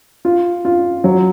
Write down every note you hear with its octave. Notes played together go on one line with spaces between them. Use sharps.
F4
F4
F#3